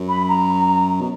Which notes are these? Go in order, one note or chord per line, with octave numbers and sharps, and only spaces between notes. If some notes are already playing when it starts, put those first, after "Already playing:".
Already playing: F#2
B5
A#5
B2